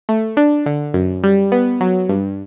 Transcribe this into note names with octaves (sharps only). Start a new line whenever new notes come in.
A3
D4
D3
F#2
G3
B3
F#3
G2